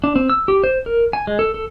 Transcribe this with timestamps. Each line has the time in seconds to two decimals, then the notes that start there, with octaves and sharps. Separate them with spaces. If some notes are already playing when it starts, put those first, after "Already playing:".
0.04 D4
0.16 C4
0.30 E6
0.48 G4
0.64 C5
0.86 A#4
1.13 G#5
1.27 G#3
1.39 A4
1.54 A4